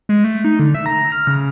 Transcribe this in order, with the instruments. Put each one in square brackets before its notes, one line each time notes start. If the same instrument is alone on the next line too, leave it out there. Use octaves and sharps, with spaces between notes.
[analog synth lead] G#3
A3
D#4
D3
E5
A#5
F6
C#3